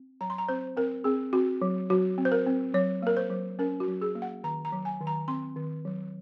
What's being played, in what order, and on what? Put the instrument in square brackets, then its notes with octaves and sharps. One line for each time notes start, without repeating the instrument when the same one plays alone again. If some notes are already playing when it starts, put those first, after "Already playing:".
Already playing: [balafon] C4
F#3 A#5
C6
A#5
C4 C5
C4 A#4
C4 G#4
C4 F#4
F#3
F#3 F#4
C4
C5
A#4
C4
F#3 C#5
A#3 A#4
C5
F#3
C#4 A#4
F#4
F#3
G#4
A#3
F#5
D#3 A#5
A#5
F#3
G#5
D#3
A#5
C4 C6
D#3
F#3